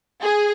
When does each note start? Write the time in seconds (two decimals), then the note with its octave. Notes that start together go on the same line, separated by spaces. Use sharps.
0.21 G#4